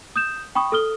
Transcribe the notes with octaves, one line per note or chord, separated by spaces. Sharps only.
D#6 G6 E7
G5 B5 C#6 D#6
A4 D#6 F6 G7